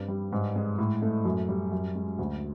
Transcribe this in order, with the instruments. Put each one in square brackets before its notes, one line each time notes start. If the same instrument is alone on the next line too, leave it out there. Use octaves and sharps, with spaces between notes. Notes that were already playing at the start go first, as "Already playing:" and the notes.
Already playing: [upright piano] G2 C4
G3
G#2
G#3
A2
A3
F#2
G3
F#2
G#3
D2